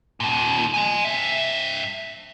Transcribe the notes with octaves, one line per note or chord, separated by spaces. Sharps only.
D#2 A#2
G#5 C6
G2 E5